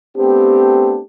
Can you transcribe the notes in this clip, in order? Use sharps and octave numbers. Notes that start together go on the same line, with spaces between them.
A3 B3 C4 D4 G4